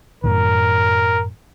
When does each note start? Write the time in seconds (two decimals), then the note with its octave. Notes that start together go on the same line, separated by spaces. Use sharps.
0.24 F#2 A2 D#3 A#4